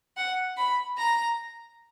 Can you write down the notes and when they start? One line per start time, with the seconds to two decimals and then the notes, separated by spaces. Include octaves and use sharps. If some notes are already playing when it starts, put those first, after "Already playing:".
0.17 F#5
0.57 B5
0.98 A#5